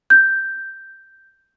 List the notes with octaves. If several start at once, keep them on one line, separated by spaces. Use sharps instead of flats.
G6